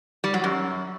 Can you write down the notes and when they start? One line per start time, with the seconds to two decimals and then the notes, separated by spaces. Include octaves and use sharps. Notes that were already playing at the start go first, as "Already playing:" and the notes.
0.24 G3
0.34 F#3
0.44 F#2